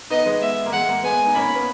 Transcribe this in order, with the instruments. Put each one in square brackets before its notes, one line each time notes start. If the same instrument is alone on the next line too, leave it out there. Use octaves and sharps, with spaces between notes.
[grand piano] B3 D#4 [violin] D#5
[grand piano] G#3 B3
[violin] E5
[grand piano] A#3
[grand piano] G#3 [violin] F#5
[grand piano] A#3
[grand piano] G#3 B3 [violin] G#5
[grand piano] D#4
[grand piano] A#3 C#4 [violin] B5
[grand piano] B3